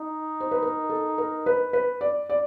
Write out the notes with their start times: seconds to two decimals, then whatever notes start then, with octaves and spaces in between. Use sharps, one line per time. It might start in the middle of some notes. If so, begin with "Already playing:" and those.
Already playing: D#4
0.40 C5
0.51 B4
0.62 A#4
0.90 A4
1.18 A#4
1.46 B4
1.73 B4
2.01 D5
2.30 D5